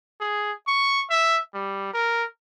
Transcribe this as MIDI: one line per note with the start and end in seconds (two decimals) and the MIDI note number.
0.20 0.52 68
0.67 1.01 85
1.10 1.38 76
1.54 1.91 55
1.93 2.24 70